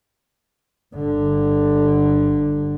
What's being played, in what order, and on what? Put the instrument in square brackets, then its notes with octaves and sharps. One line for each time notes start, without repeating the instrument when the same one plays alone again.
[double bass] G1 D3